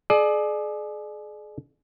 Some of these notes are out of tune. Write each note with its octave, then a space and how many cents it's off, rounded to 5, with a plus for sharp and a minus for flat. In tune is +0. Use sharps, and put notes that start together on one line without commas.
G#4 +35 D5 +30